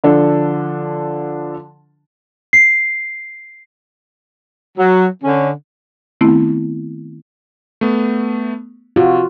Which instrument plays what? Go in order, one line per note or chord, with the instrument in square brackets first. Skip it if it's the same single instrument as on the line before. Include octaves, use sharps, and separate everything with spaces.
[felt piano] D3 F3 D4 A4
[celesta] C7
[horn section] F#3
D3 C#4
[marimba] D#3 A3 B3 C4 E4
[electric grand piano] A3 B3
[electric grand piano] C3 [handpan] F4 F#4